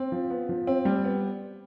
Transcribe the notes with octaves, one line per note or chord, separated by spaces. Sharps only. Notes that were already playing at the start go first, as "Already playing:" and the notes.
Already playing: C4
F3
B3
F3
C4
G3
B3